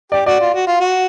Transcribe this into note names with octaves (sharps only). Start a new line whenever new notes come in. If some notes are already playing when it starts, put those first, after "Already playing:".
G4 D5
F#4 D5
F4
F#4
F4
F#4